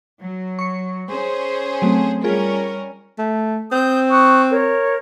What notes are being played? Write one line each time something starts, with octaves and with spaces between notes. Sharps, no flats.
F#3
C#6 C#7
C#4 G#4 C5
F#3 A3 C4
G3 C#4 F4 G#4 A#4
A3
C4 D#6 G6
C#6 D#6 F#6
A#4 C#5